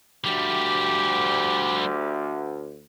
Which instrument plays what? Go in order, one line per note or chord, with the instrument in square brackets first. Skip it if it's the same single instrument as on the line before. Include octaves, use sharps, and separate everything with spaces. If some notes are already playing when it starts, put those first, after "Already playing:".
[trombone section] D2 [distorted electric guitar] F3 G3 [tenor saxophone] G4